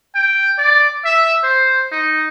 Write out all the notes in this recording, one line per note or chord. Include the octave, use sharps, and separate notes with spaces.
G5
D5
E5
C5
D#4